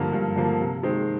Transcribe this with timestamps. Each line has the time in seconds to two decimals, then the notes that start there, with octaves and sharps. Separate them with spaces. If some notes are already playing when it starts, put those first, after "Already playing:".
Already playing: G2 D3 F3 A#3 F6
0.13 G2
0.36 D3 F3 A#3
0.60 C3
0.83 D#3 G#3 C4